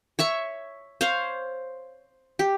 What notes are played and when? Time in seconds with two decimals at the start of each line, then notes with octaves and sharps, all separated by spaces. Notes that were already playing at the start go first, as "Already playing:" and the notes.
0.19 C#5 E5 C#6
1.01 C5 C#5 F5
2.39 G4